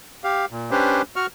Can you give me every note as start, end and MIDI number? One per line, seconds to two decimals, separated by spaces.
0.24 0.45 67
0.24 0.45 77
0.51 0.70 46
0.71 1.02 61
0.71 1.02 62
0.71 1.02 67
0.71 1.02 71
0.71 1.02 72
1.16 1.26 66
1.16 1.26 85
1.16 1.26 89